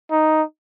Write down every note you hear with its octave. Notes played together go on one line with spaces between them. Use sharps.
D#4